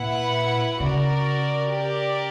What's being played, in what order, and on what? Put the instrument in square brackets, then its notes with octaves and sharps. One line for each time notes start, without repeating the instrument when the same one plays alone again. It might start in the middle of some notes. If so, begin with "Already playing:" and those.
Already playing: [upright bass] A#2 [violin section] E4 B4 F#5
[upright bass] C#3 [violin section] F#4 A#4 D5
[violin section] G4 A#4 D5